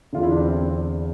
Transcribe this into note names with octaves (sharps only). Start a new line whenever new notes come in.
E2 D3 F4
E4
D4
C4